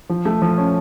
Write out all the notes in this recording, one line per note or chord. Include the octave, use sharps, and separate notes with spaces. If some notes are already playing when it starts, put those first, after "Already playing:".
F3
A3
F3
C#4